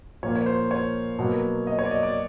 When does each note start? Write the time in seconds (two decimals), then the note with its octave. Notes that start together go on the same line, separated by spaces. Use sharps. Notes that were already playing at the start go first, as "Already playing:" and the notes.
0.23 A#2 F3 A#3 C#5
0.35 C#5
0.46 C5
0.71 C#5
1.19 B2 F#3 A#3
1.67 D#5
1.79 C#5
1.85 D5
1.91 D#5
2.03 D5